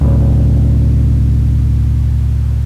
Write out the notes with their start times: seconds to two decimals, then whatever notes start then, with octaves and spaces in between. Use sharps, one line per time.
0.01 C#2 A2